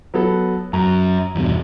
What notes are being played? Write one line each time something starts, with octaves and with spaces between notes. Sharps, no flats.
F#3 B3 A4
F#2 A#5
E2 G2 B2